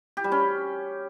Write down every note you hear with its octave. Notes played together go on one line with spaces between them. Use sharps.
G4
G3
C#4